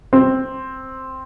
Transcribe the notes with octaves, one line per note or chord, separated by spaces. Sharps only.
C4